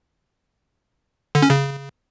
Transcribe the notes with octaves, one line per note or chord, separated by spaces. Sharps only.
D3
C#4
C#3